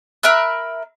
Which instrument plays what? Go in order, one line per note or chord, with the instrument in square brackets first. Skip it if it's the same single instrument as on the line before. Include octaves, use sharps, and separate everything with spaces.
[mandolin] A#4 E5 B5 F#6